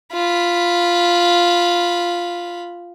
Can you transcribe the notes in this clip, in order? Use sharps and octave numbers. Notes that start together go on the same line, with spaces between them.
F4 B5